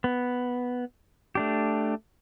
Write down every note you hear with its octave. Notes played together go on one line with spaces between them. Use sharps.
B3
A3 D4 G4